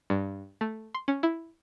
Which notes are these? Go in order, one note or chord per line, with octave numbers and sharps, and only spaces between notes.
G2
A3
C6
C#4
E4